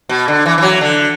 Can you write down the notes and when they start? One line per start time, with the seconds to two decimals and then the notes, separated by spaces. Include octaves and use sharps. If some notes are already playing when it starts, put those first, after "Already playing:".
0.09 B2
0.28 D3
0.46 E3
0.58 E3
0.62 F#3
0.81 D3